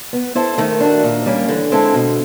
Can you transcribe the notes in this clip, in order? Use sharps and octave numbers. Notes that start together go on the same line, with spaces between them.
B3
E4 A4 C5
D#3 A3
D4 F#4
A#2
G3 A#3 C#4
D3 E3
G#3 C4 E4 A4
B2